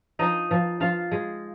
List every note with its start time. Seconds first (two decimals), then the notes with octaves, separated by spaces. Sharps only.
0.19 F3 D#4 D#5
0.51 F3
0.80 F3 F4 F5
1.11 G#3